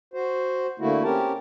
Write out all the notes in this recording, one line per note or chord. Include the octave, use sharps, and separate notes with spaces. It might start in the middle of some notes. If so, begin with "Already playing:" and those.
F#4 C5
D3 A3 A#3 E4 F#4
C4 C#4 G4 A#4 A5